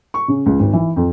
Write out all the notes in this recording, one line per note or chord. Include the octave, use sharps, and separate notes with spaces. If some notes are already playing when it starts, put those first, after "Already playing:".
C#6
C#3
C#2
G#1
E3
F2